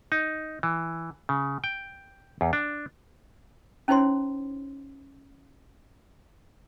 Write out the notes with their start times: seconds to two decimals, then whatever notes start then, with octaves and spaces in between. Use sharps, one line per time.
0.12 D#4
0.63 E3
1.29 C#3
1.64 G5
2.41 E2
2.53 D4
3.88 C#4 D#4 E4 C5 C#5 C6